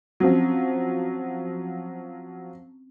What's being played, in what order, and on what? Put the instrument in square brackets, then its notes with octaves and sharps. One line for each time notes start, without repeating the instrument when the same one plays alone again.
[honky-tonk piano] F3 F#3 [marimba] C4 C#4